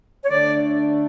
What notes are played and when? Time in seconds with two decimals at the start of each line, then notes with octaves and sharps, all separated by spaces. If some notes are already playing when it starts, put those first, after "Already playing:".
0.23 C#5
0.29 D3 A3 D4 D5